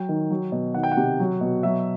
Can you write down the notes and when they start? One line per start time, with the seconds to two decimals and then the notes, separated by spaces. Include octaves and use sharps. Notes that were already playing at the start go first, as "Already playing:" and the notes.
Already playing: F#3 G5
0.09 D#3
0.30 F#3
0.52 B2
0.75 D#3 F#5
0.83 G5
0.92 F#5
0.97 C3
1.20 F#3
1.41 B2
1.63 F#3 E5